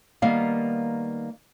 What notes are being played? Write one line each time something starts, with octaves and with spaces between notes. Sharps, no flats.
D#3 G3 A#3 B3 F5